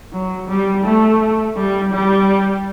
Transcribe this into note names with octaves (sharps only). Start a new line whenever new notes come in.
F#3
G3
A3
G3
G3